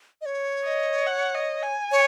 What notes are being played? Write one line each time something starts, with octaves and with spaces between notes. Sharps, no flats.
D#5
C#5
D#5
F#5
D#5
G#5
C#5